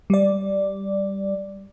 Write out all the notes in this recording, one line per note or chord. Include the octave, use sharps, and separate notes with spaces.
G3 D5